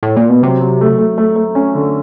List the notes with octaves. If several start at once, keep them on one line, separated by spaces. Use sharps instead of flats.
A2
A#2
B2
C3 F#3
F#3
A3
A3
A3
A3
C#4
D3